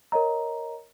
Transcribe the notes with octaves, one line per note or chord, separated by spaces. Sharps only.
A#4 C#5 D#5 A#5